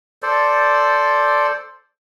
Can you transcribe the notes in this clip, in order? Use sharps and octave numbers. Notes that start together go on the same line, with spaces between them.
A4 C5 D5